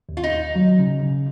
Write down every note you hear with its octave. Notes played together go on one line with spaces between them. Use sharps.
D#2
F4
D#4
D#2
F#3
C#3
C#3